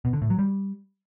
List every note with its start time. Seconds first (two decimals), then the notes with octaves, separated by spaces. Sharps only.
0.05 B2
0.13 D3
0.22 A2
0.30 F#3
0.39 G3